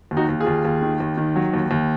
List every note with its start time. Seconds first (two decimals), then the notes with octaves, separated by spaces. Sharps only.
0.11 D#2
0.17 D#4 F#4
0.29 D#2
0.40 F4 G#4
0.47 D#2
0.65 D#2
0.82 D#3
1.00 D#2
1.17 D#3
1.36 F#3
1.54 D#2
1.71 D#2